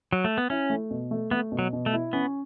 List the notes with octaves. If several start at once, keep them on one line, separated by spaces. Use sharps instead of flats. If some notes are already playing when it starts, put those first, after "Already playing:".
F#3
A3
B3
C#4 E4
A3
B2
A3
A3 B3
B2
F#3
B2
A3
E4
B3 C#4